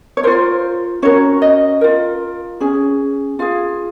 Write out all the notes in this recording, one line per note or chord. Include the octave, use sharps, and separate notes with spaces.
C#5
F4 A#4 C5
C#4 F#4 A#4 C#5
D#5
F4 A#4
C#4 G#4
F4 G#4 F5